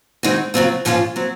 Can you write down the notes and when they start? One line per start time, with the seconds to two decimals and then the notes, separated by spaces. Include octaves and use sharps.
0.23 D#3 G#3 C4 D#4 F#4
0.54 C#3 F#3 C4 F4
0.85 G#2 F3 G#3 C#4 F4
1.16 F#3 C4